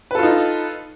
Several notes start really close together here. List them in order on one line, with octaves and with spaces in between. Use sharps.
B4 A4 F4 D#4